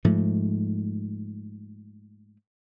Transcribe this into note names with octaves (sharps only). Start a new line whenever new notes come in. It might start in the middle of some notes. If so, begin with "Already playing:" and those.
G#2 F3 A3